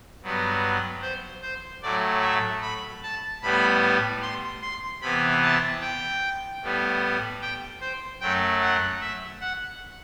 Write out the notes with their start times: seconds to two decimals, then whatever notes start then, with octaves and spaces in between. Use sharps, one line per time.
0.22 G2 F#3 B3
1.02 C5
1.42 C5
1.82 A2 F#3 A3 D5
2.22 E5
2.61 B5
3.03 A5
3.42 A2 G3 B3 B5
4.22 C6
4.61 C6
5.01 C3 E3 B3 B5
5.42 A5
5.81 G5
6.62 A2 G3 B3
7.42 G5
7.81 C5
8.21 F#2 F#3 A3 G5
8.62 F#5
9.01 E5
9.41 F#5